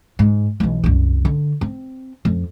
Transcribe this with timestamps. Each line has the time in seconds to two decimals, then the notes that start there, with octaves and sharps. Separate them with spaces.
0.19 G#2
0.60 B1 E3
0.84 C2 F#2
1.25 D3
1.61 C4
2.25 F2